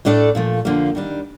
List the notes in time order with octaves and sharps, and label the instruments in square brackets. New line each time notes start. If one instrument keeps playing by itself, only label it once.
[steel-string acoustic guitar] A2 A3 D4 A4 D5
A#2 F3 A3
F2 D3 F3 A#3
D#3 G3 D4